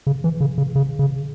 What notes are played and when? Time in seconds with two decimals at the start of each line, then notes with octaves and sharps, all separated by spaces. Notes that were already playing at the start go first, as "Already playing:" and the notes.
0.07 C#3
0.24 E3
0.40 C#3
0.58 C#3
0.76 C#3
0.99 C#3